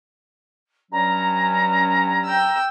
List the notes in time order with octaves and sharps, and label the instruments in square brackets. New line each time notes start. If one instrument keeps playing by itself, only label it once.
[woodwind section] G2 F#3 C#4 [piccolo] A#5
[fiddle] G5 E6